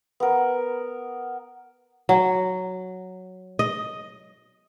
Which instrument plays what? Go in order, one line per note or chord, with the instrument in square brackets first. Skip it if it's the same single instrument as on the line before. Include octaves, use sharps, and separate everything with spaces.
[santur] B3 A#4
[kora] F#3
D#5